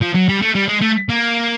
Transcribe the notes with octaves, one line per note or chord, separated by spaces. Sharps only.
F3
F#3
G3
A3
G3
G#3
A3
A#3